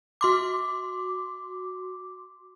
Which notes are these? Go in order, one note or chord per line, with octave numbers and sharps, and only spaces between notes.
F#4 C6 D6